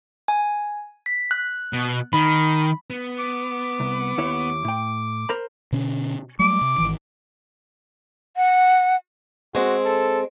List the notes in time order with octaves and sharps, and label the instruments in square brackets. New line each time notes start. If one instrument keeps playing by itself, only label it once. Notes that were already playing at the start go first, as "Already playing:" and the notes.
[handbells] G#5
B6
F#6
[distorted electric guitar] B2
[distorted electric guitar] D#3 [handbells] B5
[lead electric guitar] B3
[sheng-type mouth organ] D6
[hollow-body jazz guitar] C2
D#2 E4 C#5
A2 G5
A#4 C5 B5
[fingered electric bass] B2 D3 C#4
[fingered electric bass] F#3 G3 A3 [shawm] D6
[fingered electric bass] C3
G#1 D#3 E3
[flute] F#5
[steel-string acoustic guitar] G#3 C4 [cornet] F#4
[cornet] A4